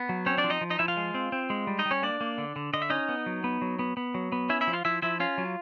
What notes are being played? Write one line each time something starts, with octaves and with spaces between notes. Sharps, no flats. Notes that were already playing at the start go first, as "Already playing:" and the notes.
Already playing: B3
F#3
C4 C#4 C#5
D4 D5
F3
D#4 D#5
F3
D#4 D#5
F3 E4 E5
F4 F5
G#3
C4
C4
G#3
G3
D#4 D#5
G3
C#4 C#5
A#3 D4 D5
A#3
D3
D3
D3 D#5
E5
C#4 D#4 D#5
B3
F#3
B3
F#3
B3
B3
F#3
B3
C#4 E4 E5
E4 E5
F3
F4 F5
F3 E4 E5
F3 E4 E5
C#4 F4 F5
F#3